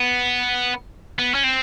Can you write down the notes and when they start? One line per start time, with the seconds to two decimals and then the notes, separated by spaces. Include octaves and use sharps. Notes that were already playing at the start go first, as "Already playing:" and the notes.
Already playing: B3
1.19 B3
1.35 C#4
1.44 C4